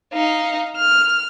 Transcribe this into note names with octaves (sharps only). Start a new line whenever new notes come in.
D#4 F5
F6